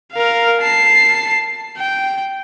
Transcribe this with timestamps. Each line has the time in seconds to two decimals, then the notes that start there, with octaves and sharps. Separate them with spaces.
0.13 A#4 F5
0.61 A5 C7
1.77 G5